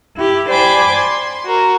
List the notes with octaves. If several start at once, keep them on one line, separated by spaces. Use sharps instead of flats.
E4 G4
C5 D5 G5 G#5 B5 D6
C6
F#4 A#4